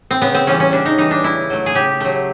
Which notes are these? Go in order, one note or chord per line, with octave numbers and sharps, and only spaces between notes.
C4
C#3 B3
C4
E3 G3 C#4
C#4
C#3 D4
D#4
E3 G3 D#4
D4
C#3 E4
F#3 A3
G#4
C#3 G4
F#3 A3